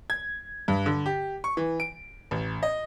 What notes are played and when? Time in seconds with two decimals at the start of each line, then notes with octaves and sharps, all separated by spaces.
0.10 G#6
0.68 G2
0.86 D3
1.06 G4
1.44 C#6
1.57 E3
1.80 D7
2.31 A1
2.63 D#5